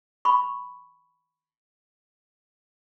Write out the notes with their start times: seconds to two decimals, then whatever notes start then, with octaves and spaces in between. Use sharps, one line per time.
0.25 B5 C#6